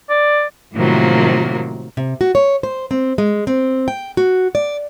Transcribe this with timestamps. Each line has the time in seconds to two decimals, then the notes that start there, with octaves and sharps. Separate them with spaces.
0.10 D5
0.74 A2 C3 D#3 F3 F#3 A#3
1.97 C3
2.21 F#4
2.35 C#5
2.63 C5
2.91 C4
3.18 G#3
3.47 C4
3.88 G5
4.17 F#4
4.55 D5